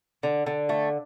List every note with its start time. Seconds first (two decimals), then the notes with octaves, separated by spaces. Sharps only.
0.23 D3
0.46 D3
0.69 A3